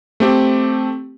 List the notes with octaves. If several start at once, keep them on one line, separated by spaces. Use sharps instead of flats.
A3 C4 G4